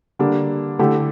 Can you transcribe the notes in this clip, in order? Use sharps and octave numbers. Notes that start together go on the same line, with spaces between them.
D3 G3 A#3 D4
D3 A3 E4 G4